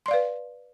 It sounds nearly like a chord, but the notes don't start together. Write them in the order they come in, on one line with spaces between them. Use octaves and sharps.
C6 D5 F5 B4